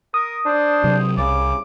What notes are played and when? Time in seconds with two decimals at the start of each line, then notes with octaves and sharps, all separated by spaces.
0.14 A#4 D#6
0.46 D4 C5
0.84 C3 F#3
1.18 C2 C#3 D6